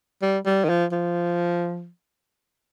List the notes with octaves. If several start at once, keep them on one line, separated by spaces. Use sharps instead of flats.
G3
G3
D#3
F3
F3